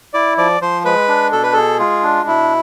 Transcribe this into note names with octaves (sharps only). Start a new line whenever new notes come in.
E4 D5
F3 D5
F3 C5
G#3 B4
D4
B2 A4
B4
G#4 A4
G#3 F4
D4
B2 E4